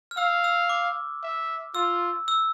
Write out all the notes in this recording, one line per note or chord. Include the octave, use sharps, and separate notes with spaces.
F6
F5 E6
E6
D6
E5
F4 E6
E6